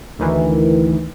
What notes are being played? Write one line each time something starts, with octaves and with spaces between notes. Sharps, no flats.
D2 D#3 E3